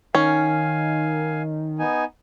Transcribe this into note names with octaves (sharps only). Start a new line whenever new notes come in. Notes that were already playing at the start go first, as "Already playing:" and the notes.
D#3 C#4 F5 G#5
B3 D#4 G#5